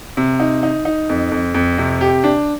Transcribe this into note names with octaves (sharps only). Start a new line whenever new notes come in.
C3
D#4
D#4
D#4
F2
F2
F2
C3
G4
D4